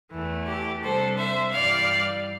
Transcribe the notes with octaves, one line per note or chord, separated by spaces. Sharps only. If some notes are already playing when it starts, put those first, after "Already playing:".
E2 E3 A3
G4
C3 G3 D4 A4 C5
C5 E5
G2 E3 G3 D5 F5